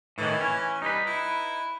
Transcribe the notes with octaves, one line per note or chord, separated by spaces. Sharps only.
A2 D#3 E3
C#4
G3 D#4 B4
E4